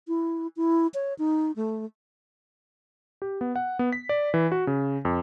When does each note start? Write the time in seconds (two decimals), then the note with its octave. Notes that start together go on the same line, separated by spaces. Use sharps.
0.08 E4
0.56 E4
0.94 C#5
1.19 D#4
1.56 A3
3.22 G4
3.41 B3
3.56 F#5
3.79 B3
3.92 B6
4.09 D5
4.34 E3
4.52 F#4
4.67 C#3
5.05 F2